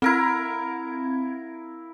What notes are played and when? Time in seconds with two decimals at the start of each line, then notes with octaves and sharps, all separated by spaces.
0.02 C4 E4 A#4 F5 G#6